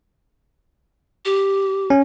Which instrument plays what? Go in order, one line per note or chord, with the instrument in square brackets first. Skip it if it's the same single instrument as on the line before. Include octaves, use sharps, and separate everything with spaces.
[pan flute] G4
[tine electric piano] C#4